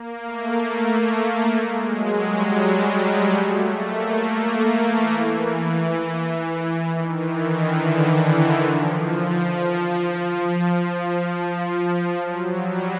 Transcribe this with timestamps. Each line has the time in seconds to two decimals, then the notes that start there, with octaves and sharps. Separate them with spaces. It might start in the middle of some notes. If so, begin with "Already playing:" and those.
Already playing: A#3
0.24 A3
1.57 G#3
1.86 F#3
2.16 G3
2.46 G3
2.90 G#3
3.34 A3
3.78 A#3
4.22 A#3
4.51 A3
4.82 E3
6.88 D#3
7.17 E3
7.47 D3
7.76 D3
8.65 F3
12.19 F#3
12.48 G3